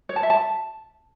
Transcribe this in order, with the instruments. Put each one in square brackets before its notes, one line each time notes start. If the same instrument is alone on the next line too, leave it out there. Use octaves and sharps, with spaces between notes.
[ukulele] C#5
A5
E5
A5